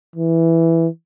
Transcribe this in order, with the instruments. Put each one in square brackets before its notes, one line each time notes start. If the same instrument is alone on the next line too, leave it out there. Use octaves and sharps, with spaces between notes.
[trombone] E3